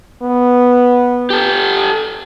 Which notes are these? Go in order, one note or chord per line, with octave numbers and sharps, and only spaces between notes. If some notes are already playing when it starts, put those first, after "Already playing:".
B3
G4 A4